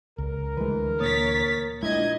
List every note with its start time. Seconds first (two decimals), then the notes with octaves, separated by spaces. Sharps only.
0.18 C#2 A#4
0.57 D2 E3 G#3 B4
1.01 A#2 A#3 C#5 D#6 A6 B6
1.83 A#2 G#3 D4 E4 D#5 G#6